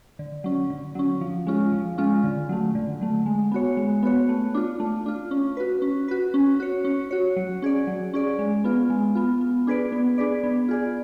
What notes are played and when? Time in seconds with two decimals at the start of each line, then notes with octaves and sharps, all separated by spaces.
0.19 D3
0.44 F#3 C#4
0.70 D3
0.95 F#3 C#4
1.21 F3
1.47 G#3 C#4 F4
1.72 F3
1.98 G#3 C#4 F4
2.24 D3
2.49 F#3 A3
2.75 D3
3.01 F#3 A3
3.26 G#3
3.51 B3 F#4 C#5
3.77 G#3
4.03 B3 F#4 C#5
4.29 A3
4.54 D4 F4
4.80 A3
5.06 D4 F4
5.31 C#4
5.57 F#4 B4
5.82 C#4
6.08 F#4 B4
6.34 C#4
6.60 F#4 C#5
6.85 C#4
7.11 F#4 C#5
7.36 F#3
7.62 C#4 G#4 D5
7.87 F#3
8.14 C#4 G#4 D5
8.39 G#3
8.64 B3 F4
8.90 G#3
9.15 B3 F4
9.41 B3
9.67 D4 G#4 B4 D5
9.92 B3
10.18 D4 G#4 B4 D5
10.43 B3
10.68 F4 G#4 D5